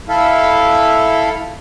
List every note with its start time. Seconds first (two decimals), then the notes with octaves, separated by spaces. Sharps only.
0.09 E4 A4 E5 F5